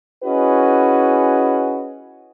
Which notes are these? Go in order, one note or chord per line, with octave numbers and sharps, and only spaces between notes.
C#4 E4 F#4 G#4 B4 D#5